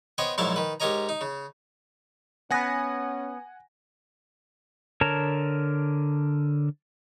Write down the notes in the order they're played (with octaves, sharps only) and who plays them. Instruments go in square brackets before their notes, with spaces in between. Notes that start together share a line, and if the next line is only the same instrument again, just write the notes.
[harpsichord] B3 C5 C#5 D#5 G5
A#1 G#2 F#3 E4 F5 A5
D#3 B4
G#2 G4 A#4 C#5 D#5 A#5
D#4
C#3
[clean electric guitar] B3 B4 [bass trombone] C#4 [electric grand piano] F#5 G#5 A#6
[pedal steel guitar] D3 A#4 C#5 A5 A#5